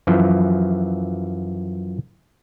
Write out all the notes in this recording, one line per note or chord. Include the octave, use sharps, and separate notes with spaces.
F#2 E3 F3